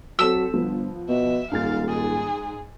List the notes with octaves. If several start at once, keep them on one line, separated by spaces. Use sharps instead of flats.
F#3 C4 A4 E6 B6
G1 F3 B3
B2 E5
D#1 G#2 F5 G#5 A6
G#4